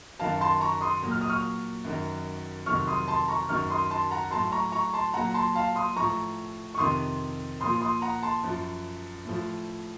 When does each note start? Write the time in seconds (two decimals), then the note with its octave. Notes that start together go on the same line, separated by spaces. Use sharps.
0.19 F#2 D#3 F#3 F5 A5
0.41 A5 C6
0.61 A#5 C#6
0.81 C6 D#6
1.02 A#2 F#3
1.11 F6
1.21 D#6
1.29 C#6 F6
1.84 F#2 D#3 F#3
2.66 F2 C3 D#3 F#3 C#6 F6
2.87 C6 D#6
3.08 A5 C6
3.28 A#5 C#6
3.49 F#2 D#3 F#3 C#6 F6
3.70 C6 D#6
3.91 A5 C6
4.11 F#5 A#5
4.31 A2 F#3 A5 C6
4.52 A#5 C#6
4.72 A#5 C#6
4.93 A5 C6
5.14 A#2 F#3 F#5 A#5
5.34 A5 C6
5.55 F5 A5
5.75 C6 D#6
5.96 A2 F3 A#5 C#6
6.74 C#6
6.78 F2 C3 D#3 C6 D#6
7.61 A#2 F3 C6 D#6
7.81 C6 D#6
8.02 F#5 A#5
8.23 A5 C6
8.43 F#2 F3
9.25 A2 F3